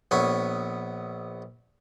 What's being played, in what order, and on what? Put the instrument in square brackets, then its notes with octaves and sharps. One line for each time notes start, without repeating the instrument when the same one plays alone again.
[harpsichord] A#1 B3 C#5